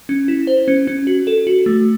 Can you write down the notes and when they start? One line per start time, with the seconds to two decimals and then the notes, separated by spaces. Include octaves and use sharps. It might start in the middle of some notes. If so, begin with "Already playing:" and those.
0.09 C#4
0.28 E4
0.47 C5
0.68 C#4
0.87 C#4
1.07 F#4
1.27 A4
1.47 F#4
1.66 A3